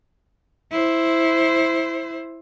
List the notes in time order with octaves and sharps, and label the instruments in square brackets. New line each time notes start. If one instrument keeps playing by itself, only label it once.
[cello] E4 C5